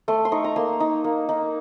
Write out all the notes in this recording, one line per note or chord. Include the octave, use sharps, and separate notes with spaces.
A3 C6
C6
D#4 C#6
A#5
A#3 C6
D#4
A#3
D#4